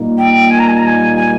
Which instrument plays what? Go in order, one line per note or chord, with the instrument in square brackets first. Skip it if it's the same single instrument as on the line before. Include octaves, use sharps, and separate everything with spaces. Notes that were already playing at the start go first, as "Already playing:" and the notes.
Already playing: [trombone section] A#2 G3 A#3 D#4
[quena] G5
G#5
A#5
G#5
A#5
G#5
G#5